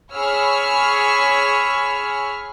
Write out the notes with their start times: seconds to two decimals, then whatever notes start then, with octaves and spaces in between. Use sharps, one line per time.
0.13 G#4 C#5 B5 C#6 E6 F6